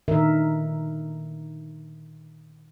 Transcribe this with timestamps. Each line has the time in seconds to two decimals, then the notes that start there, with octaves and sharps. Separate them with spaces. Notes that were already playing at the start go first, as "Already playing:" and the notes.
0.08 A#2 D3 D#3 A#4 E5